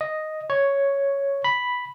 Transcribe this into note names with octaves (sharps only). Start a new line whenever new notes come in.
D#5
C#5
B5